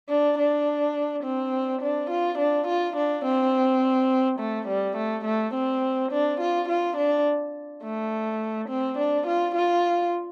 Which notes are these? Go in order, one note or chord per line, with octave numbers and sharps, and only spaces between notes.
D4
D4
C4
D4
F4
D4
F4
D4
C4
A3
G3
A3
A3
C4
D4
F4
F4
D4
A3
C4
D4
F4
F4